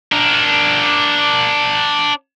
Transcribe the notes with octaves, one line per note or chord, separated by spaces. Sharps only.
D4 A#4